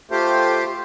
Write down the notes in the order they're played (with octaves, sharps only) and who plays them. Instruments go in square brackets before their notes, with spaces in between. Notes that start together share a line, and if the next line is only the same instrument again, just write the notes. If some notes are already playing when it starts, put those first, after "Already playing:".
[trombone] A3 [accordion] F4 G4 C5